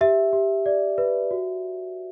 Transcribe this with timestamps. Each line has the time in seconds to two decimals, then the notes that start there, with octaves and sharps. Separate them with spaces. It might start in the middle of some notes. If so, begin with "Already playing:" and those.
0.01 G4 E5
0.33 G4
0.66 D5
0.98 B4
1.31 F#4